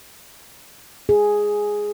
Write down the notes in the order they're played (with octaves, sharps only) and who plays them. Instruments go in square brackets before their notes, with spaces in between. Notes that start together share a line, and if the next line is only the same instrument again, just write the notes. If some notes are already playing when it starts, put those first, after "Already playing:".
[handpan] G#4